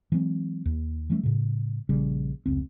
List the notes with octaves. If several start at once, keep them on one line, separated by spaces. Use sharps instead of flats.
E3 F#3 G#3 C4
D#2
E3 G3 A3 C#4
A2 C#3
A#1 C#3 G3 C#4
F1 C#2 C4